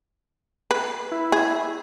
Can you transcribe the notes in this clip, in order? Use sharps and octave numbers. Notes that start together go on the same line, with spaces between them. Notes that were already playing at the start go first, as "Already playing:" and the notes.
B4
E4
G#4